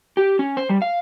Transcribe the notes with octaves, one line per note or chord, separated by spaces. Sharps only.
G4
C#4
C5
G3
F5